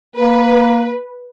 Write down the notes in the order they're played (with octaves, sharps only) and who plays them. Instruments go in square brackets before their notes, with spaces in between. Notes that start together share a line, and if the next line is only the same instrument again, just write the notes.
[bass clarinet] A#3 [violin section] B4